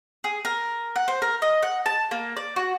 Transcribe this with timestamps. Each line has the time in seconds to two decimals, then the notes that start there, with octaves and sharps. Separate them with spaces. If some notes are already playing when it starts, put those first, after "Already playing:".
0.24 G#4
0.45 A#4
0.96 F#5
1.08 C5
1.22 A#4
1.42 D#5
1.63 F#5
1.86 A5
2.11 A#3
2.36 D5
2.56 F#4